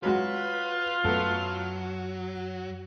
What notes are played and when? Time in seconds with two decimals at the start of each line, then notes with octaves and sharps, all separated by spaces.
0.03 F#3 G#3 F4 F#4 B4
1.05 F#2 F#3 A3 B3 A4